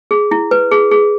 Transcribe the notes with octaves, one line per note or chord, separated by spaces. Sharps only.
G#4
E4
B4
G#4
G#4